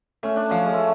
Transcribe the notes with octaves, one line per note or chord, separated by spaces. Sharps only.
A3 C#4
D4
F3 C#4
G#3
A3